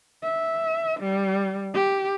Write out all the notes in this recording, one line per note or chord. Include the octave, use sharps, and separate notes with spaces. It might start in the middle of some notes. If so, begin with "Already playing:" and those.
E5
G3
G4